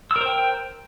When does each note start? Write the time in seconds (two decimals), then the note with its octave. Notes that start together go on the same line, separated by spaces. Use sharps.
0.11 E6
0.16 A#4
0.21 C5
0.26 G5